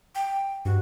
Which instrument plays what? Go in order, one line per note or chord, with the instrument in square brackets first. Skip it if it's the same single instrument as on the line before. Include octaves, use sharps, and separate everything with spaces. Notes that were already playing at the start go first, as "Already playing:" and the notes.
[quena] G5
[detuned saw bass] G2 [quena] F#4